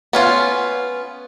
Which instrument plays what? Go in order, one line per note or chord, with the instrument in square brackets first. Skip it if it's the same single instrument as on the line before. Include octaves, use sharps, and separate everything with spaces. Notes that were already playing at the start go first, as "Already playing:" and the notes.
[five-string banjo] B3 C#4 F4